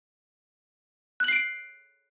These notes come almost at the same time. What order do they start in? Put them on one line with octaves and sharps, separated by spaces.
F#6 F#7 C7 D7